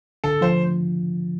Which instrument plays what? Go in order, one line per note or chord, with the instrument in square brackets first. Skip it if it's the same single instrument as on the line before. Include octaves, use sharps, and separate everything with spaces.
[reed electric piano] D3 [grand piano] A4
[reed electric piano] F3 [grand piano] C5